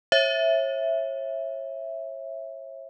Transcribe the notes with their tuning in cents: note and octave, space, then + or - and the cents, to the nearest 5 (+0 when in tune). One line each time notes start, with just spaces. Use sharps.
C#5 -35 E5 +0